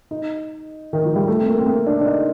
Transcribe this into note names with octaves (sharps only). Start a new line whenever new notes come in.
D#4
D#3
F3
G3
A3
C4
A#3
C4
A#3
D4
D4
D#4